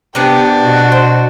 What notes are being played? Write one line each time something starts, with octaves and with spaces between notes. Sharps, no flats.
C3 B3 D4 G4
B2 F#4
C5